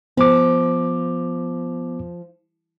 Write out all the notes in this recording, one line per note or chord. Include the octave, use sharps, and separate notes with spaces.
F3 B3 D6